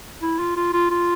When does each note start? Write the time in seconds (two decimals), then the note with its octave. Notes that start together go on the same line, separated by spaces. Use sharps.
0.22 E4
0.39 F4
0.56 F4
0.73 F4
0.91 F4